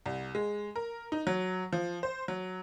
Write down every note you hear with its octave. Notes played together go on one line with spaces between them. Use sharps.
C2
G#3
A#4
D#4
F#3
F3
C5
F#3